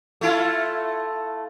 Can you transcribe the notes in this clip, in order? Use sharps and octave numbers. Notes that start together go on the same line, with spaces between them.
A3 E4 F4